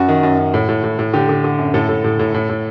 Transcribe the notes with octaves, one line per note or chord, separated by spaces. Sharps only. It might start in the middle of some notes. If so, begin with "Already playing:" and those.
Already playing: F#2 F#4
D#3
F#2
F#2
A2
A2
A2
A2
D3 G4
D3
D3
F#2
A2 A4
A2
A2
A2
A2
A2